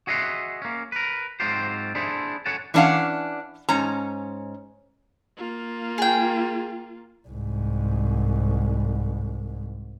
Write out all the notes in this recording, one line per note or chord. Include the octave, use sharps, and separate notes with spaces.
F#4 G#4 D#5 E5 F#5 C6
A#3 C#4
A#4 B4
G#2 F#3 C4 F4 G4 C5
D4 E4 G#4 A4 C5 E5
A4 C#5 F#5 G#5 A5
E3 C#4 D4 D5 F5 F#5
G#2 C#4 A#5
A#3 F4
G#4 G5
C2 G#2